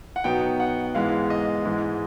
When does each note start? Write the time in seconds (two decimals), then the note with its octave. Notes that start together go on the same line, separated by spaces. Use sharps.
0.16 F#5
0.24 B2 F#3 B3 D#4 G5
0.60 F#5
0.95 G#2 E3 G#3 B3 F5
1.30 D#5
1.65 G#2 E3 G#3